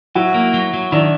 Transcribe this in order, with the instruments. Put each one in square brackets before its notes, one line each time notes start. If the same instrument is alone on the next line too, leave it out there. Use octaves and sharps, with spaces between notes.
[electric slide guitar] F#3 [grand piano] E4 F#4
[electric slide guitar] A#3
F#3
F#3
[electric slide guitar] D#3 [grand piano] D4 E4